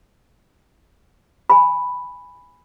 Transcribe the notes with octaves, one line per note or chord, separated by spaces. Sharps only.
G#5 B5